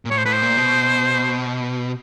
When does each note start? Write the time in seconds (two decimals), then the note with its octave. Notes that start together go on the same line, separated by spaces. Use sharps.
0.05 A#2
0.10 A2 C#5
0.18 C5
0.25 A2 B4
0.33 C5
0.42 A#2
0.57 B2